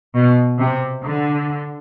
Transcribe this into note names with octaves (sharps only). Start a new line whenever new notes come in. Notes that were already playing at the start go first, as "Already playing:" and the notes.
B2
C3
D3